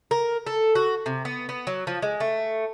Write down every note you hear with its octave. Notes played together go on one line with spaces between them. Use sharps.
A#4
A4
F#4
C3
B3
B3
F#3
F3
G#3
A3